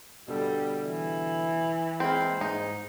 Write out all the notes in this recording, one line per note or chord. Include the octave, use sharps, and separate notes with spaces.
B2 D3 G3 A4
E3
G#3 A#3 C4 B5 C6
G#2 D#4